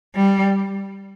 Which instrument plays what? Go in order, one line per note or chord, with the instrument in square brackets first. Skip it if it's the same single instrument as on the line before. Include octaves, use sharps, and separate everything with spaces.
[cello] G3